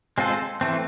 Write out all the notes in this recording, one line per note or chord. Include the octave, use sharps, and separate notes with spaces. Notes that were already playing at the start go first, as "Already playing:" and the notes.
G#3 C4 F4 A4 C5
E3 A3 C4